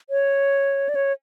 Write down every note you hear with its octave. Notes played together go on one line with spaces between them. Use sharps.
C#5
D5
C#5